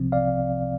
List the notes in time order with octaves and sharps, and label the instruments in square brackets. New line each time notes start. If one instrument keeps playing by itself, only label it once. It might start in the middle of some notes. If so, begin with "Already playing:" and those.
Already playing: [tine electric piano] C2 C3 F3 C4
D5 F5